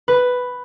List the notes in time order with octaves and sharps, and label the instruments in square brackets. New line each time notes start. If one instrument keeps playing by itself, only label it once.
[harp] B4